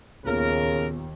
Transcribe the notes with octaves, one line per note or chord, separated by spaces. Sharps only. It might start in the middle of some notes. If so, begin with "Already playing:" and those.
D#2 A#2 C#3 B3 A#4